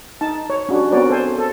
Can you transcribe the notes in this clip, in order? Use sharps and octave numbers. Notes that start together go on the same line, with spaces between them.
D#4 A5
C#5
C#4 D4 F#4 G4
B3 C4 F#4 A#4 C#5 D5
A4 C5 G#5
A4